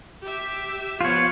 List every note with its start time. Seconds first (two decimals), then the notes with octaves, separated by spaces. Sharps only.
0.22 G4 E5
1.01 F3 B3 F4 C#5